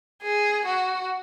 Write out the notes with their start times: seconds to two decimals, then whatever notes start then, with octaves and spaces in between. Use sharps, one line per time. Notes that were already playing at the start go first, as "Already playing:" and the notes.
0.23 G#4
0.66 F#4